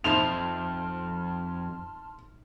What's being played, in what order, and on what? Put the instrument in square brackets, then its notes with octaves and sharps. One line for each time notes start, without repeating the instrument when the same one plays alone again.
[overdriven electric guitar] F2 [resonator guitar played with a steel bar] D#4 E4 C5 [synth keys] A5 C6 F6 [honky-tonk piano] F7